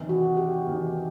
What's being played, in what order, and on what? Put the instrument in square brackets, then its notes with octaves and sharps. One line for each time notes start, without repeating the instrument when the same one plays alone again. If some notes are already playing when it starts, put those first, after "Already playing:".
Already playing: [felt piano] E2 C3 D#3
[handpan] F#4
G4
[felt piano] E2 C3 D#3